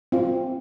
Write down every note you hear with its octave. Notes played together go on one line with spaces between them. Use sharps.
C4 F4